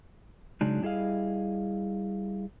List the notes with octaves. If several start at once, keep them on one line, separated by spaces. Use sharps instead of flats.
C#3 F#3 G#3 D4 D#4
G3 E4 G#4 D#5 F5